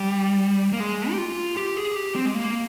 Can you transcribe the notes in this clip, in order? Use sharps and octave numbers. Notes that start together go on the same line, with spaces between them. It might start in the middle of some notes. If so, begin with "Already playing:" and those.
Already playing: G3
A#3
G#3
G4
F4
G4
G#4
G4
C4
G#3
A#3